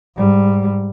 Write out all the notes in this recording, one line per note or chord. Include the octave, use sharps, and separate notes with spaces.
G#2 G3